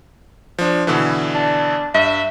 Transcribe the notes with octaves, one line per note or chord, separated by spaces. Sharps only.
F3 D4
B2 D3 E3
D4
G2 E5